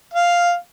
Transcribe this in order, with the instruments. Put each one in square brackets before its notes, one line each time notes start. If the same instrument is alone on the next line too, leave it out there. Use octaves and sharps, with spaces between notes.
[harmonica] F5